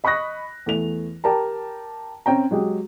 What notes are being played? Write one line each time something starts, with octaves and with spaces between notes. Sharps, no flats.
D#5 B5 C#6 D#6 F#6 A#6
E2 A3 F7
G4 A#4 A5 A#5
C4 C#4 G5 A#5
F#3 G#3 G4